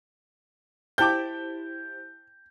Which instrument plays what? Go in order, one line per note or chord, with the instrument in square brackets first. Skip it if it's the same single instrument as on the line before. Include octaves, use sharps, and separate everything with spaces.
[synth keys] E4 G4 C5 [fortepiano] G5 A5 D6 [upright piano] G6